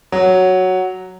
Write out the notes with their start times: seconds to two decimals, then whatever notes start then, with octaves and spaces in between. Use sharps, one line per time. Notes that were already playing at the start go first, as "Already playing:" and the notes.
0.12 F#3